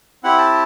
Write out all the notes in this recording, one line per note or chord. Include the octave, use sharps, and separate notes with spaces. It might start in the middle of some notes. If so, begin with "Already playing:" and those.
C4 E4 G4 F#5
A5